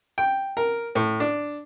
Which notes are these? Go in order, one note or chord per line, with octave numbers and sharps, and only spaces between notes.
G5
A#4
A2
D4